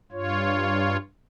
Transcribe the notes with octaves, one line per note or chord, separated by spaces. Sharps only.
G2 F4 C#5